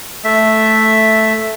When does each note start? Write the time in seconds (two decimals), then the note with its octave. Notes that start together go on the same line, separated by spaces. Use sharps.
0.24 A3 E5